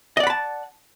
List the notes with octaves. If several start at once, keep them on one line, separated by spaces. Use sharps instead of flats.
D5 D#5 F#5 A5 B5